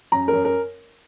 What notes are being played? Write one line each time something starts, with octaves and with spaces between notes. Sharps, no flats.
F#2 A#5
A#4
F#2
A#4